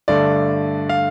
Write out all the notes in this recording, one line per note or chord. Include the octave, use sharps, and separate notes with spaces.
G2 D3 A3 D5
F5